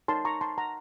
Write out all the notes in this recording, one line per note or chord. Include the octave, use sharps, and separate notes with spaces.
D#4 A#4 C#5 A5 C6
A#5 C#6
A5 C6
F#5 A#5